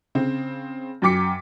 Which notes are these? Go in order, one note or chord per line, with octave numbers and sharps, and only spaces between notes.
C#3 C4
F#2 F#3 G5 D6 B6 C#7